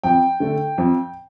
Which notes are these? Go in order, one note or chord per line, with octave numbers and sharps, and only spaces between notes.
F2 G5
D3 A3
F2